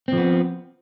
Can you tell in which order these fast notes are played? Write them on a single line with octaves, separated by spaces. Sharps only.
C4 F3 B3